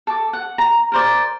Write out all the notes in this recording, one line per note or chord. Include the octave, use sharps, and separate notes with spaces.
A4 D6
F#5
A#5
A#4 C5 D5